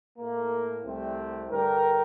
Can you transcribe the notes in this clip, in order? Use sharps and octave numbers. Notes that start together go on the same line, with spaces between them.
A2 A3 A#3
C2 C3 G3 A3 C4
G2 D3 G3 G4 A#4